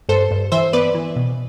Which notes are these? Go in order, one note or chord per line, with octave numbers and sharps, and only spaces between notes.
G2 A4 C5
G2
E3 C5 E5
B3 B4 D5
E3
B2